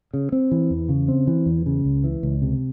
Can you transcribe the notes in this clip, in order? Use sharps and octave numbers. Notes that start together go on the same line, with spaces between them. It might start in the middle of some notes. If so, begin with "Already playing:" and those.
C#3
C4
E3
E2
C#3
C4
E3
E2
C#3
C#2
E3
C#2
C3